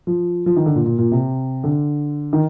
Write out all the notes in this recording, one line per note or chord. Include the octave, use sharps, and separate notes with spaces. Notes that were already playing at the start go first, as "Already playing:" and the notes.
F3
F3
D#3
D3
A#2
A#2
A#2
C3
D3
D#3